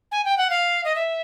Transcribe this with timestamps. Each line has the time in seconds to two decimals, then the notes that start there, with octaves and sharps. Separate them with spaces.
0.12 G#5
0.25 G5
0.37 F#5
0.50 F5
0.85 D#5
0.95 E5